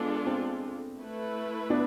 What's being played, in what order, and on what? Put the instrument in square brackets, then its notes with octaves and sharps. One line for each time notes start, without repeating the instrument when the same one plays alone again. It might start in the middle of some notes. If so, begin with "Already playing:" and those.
Already playing: [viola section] G#3 D4 F4 A4 [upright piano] B3
[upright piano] C4
[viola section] A3 E4 B4
[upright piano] B3 D4